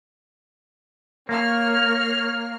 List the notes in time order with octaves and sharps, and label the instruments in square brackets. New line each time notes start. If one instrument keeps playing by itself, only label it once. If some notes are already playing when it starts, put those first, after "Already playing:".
[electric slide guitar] A#3 [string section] C#5 F6